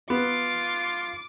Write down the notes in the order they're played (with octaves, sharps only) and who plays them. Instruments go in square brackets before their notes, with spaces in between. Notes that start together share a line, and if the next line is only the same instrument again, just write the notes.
[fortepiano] B3 [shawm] F4 [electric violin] D6